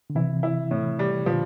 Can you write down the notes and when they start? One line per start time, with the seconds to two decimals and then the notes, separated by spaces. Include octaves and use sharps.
0.10 D3
0.15 C3 E3 E4
0.43 E4
0.71 A2
0.99 G3
1.26 A#2 D3 F3